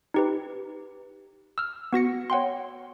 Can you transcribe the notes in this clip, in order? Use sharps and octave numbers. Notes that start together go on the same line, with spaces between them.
D#4 G4 B4
E6 F6
B3 F#4 A#6 C#7
C#5 F#5 G5 C6